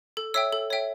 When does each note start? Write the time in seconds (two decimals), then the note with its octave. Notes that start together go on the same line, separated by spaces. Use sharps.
0.17 A4
0.34 C#5 E5 G5 E6
0.52 A4
0.70 C#5 E5 G5